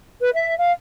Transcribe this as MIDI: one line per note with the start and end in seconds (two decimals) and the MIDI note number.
0.20 0.30 71
0.33 0.56 76
0.58 0.71 77